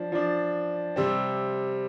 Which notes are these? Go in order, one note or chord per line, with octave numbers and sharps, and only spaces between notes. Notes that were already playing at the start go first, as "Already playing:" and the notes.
Already playing: F3 D4
F3 D4
C3 G3 C4